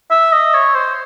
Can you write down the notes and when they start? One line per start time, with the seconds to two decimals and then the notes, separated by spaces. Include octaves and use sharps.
0.10 E5
0.32 D#5
0.54 C#5
0.75 C5